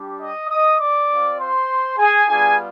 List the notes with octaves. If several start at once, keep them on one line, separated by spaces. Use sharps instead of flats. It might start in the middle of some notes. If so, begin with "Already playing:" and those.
Already playing: G3 D4 G4
D#5 D#6
D#5 D#6
D5 D6
C4 F4
C5 C6
G#4 G#5
G3 B3 D4 F4 G#4 G#5